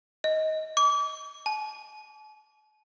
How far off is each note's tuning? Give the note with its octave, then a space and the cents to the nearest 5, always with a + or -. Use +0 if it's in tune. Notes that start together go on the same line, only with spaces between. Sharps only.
D#5 +15
D6 -35
A5 -45